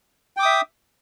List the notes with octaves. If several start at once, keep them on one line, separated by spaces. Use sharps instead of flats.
E5 G5 D6 D#6